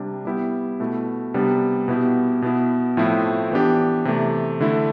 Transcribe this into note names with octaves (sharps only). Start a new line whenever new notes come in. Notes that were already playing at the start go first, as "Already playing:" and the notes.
Already playing: C3 G3 D4
G3 B3 E4 G4
B2 A3 E4
C3 G3 B3 D4
B2 B3 E4 G4
B2 B3 E4
A2 F3 A3 C4 E4
E3 B3 D4 G4
C3 E3 A3
D3 A3 E4